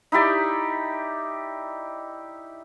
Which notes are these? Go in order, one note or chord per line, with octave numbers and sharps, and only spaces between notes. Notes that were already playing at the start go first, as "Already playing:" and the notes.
D#4 E4 G4 D5